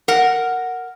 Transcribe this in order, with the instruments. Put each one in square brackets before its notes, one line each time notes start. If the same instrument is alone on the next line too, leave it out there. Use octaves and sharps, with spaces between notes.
[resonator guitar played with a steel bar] A#4 F#5